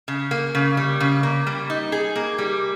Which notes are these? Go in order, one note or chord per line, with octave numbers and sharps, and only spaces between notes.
C#3
A#3
C#3
G3
C#3
A#3
G3
D#4
G#4
A#3
G3